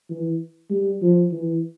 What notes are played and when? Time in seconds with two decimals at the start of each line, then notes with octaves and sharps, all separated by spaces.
0.10 E3
0.70 G3
1.02 F3
1.32 E3